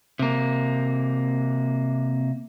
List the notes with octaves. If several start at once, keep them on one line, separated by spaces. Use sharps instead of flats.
C3 A#3